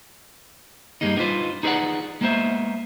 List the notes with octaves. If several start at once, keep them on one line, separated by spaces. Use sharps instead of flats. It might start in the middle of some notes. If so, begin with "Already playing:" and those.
G2 G3 G#3 A#3 D#4
B3 D4 D#4 F4 B4 C5
D#4 G#4 B4 C#5 D5 F#5
G#3 A#3 B3 C5 E5